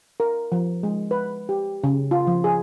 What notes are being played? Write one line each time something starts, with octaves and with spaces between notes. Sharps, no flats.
A#4
F3
G#3
B4
G4
C#3
F4
F3
G#4